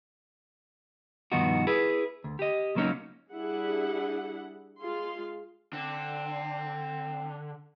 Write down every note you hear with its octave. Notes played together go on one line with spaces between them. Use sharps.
G2 B2 D#3 F3 D#4 F#4
E4 G#4 B4
D2
G4 D#5
C#2 F#3 A#3 C#4 D#4
G3 D4 E4 G4 G#4 F#5
G#3 F4 G#4 F5 C6
D3 C4